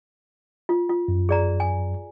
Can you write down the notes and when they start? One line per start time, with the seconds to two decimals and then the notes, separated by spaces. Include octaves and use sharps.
0.69 F4
0.89 F4
1.08 F#2
1.29 G#4 D5 A#5
1.60 G#5